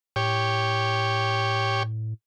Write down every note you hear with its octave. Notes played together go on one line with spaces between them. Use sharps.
A2 G4 C#5